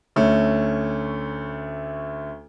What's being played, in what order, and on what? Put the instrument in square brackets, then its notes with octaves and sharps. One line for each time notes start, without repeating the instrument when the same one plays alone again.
[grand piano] D2 A3 C#4